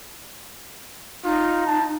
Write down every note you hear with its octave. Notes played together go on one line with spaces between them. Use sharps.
D#4 F4
A5